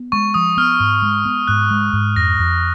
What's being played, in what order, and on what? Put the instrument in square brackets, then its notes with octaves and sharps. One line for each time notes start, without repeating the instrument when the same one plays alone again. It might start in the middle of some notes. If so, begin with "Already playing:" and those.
Already playing: [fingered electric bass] B3
[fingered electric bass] G#3 [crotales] C#6
[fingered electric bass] F3 [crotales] D#6
[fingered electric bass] B3 [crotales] F6
[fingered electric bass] G#2
G#3
B3
[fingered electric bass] G#2 [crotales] F#6
[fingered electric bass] G#3
G#2
[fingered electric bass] F2 [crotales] A#6
[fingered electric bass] F2